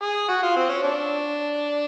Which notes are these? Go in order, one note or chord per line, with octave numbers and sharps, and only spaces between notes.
G#4
F#4
F4
C4
C#4
D4